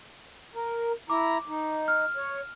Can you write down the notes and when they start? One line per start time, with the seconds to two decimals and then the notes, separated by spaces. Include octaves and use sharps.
0.55 A#4
1.10 E4 A#5 D6
1.48 D#4
1.88 F6
2.16 C#5